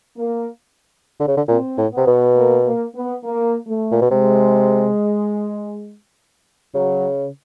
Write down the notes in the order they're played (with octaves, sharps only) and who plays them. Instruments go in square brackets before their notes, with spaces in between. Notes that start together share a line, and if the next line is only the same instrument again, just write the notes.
[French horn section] A#3
[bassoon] D3
C#3
D3
[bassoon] A#2 [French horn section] C4
[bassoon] A2
[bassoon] C3 [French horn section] B3
[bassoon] B2
[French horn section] A#3
A#3
B3
A#3
A3
[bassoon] A#2
B2
[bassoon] C3 [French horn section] G#3
[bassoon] C#3 [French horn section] F#3